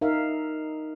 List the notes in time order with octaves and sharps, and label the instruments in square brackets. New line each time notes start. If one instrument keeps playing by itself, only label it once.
[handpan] D#4 A#4 E5 F5